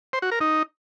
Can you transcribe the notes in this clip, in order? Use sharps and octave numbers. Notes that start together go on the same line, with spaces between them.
C5
F#4
A#4
D#4